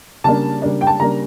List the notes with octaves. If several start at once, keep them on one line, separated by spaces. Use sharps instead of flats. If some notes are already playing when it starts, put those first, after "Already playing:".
C#3 G3 A#3 D4 A5
C#3 G3 A#3 D4
G5
A5
C#3 G3 A#3 D4 A#5